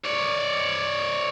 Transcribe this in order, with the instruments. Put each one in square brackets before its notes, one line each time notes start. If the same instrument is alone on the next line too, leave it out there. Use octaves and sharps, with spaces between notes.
[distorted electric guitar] C#5 D5